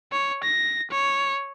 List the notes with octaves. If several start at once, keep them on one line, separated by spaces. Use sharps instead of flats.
C#5
A#6
C#5